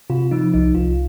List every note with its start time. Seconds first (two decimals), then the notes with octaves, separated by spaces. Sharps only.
0.10 C3 F4
0.31 F3 D#4
0.53 C2 D#4
0.75 C2 F4